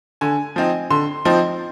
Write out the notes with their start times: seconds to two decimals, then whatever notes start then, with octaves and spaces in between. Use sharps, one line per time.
0.21 D3 G#5
0.56 F3 C4 D#4
0.91 D3 C6
1.25 F3 C4 D#4